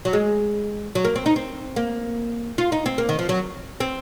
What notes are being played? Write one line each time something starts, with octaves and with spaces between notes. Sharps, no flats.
F#3
G#3
F#3
A#3
C4
D#4
C4
A#3
F4
D#4
C4
A#3
D#3
F3
F#3
C4